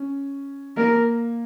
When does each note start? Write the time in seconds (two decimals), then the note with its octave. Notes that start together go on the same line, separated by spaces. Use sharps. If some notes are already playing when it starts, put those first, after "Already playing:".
Already playing: C#4
0.77 A#3 A#4